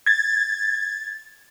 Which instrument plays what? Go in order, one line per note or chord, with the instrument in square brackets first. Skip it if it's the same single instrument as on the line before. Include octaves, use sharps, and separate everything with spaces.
[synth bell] G#6 A6